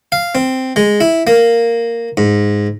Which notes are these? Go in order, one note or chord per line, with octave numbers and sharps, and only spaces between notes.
F5
C4
G#3
E4
A#3
G#2